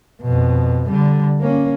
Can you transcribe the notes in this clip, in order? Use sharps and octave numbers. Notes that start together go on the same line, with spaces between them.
F2 B2
D3 G3
A#3 C#4